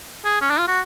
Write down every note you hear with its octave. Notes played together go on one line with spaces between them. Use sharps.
G#4
C#4
D4
F4
F#4